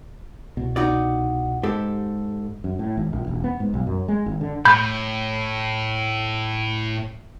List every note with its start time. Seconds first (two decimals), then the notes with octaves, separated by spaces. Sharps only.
0.57 C2 B2
0.76 D#4 F#4 D5
1.63 G#2 G4 A4
2.64 F#2
2.79 A2
2.97 G#1
3.13 A#1
3.28 E1
3.44 B3
3.60 G#2
3.74 B1
3.87 F#2
4.08 G#3
4.26 G#1
4.41 D3
4.65 A2 B5 G6